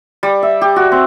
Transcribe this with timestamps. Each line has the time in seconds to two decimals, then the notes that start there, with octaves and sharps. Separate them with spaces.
0.23 G3
0.43 E5
0.61 G4
0.76 F#4
0.92 C4